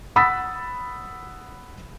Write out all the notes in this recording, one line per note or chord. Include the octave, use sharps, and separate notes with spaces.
F#5 B5 D#6 E6 A6 B6